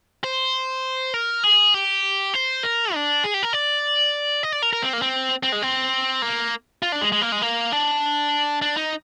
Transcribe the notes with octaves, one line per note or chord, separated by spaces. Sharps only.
C5
A#4
G#4
G4
C5
A#4
D4
G#4
G4
A#4
D5
D#5
D5
A#4
A#4
C4
A#3
C4
C4
G#3
C4
A#3
F4
D4
G#3
G#3
A#3
G#3
A#3
D4
D4
D#4